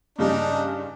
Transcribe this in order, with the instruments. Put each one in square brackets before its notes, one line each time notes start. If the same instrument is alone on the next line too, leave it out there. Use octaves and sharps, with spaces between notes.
[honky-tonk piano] G2 C#3 G3 [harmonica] D4 D#4